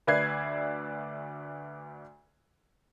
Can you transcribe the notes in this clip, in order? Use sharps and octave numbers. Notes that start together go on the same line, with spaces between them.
D2 B4 D5 E5 G#6 C7